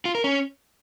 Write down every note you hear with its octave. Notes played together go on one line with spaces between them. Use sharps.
F4
A#4
C#4